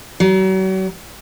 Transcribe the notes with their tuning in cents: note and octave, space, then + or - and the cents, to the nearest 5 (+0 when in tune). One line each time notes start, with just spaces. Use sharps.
F#3 +40